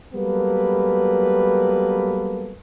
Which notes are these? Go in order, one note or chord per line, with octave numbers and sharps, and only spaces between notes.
F#3 G3 A#3 B3 A4 B4